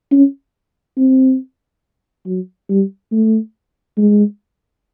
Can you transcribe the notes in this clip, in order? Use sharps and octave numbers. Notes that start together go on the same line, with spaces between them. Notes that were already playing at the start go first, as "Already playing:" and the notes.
C#4
C4
F#3
G3
A3
G#3